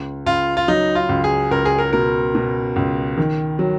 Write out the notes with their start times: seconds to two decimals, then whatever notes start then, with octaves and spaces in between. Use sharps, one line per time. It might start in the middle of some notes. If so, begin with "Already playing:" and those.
Already playing: C#2
0.26 C#2 F4
0.57 F4
0.68 F#3 D#4
0.95 F4
1.09 C#2
1.24 G#4
1.51 C#2 A#4
1.65 G#4
1.78 A#4
1.93 B2 A#4
2.35 B2
2.76 C#2
3.18 D#3
3.59 F#3